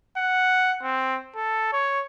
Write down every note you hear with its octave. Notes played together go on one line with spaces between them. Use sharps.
F#5
C4
A4
C#5